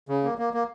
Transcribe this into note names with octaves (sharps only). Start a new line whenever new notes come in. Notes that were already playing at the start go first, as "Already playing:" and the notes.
C#3
A#3
A#3
A#3